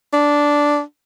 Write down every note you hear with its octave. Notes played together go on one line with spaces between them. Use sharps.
D4